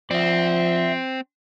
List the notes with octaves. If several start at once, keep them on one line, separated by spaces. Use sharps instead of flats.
F3 C4 D5 E5